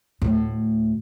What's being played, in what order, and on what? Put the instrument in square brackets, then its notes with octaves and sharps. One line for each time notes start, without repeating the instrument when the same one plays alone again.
[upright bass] D2 A2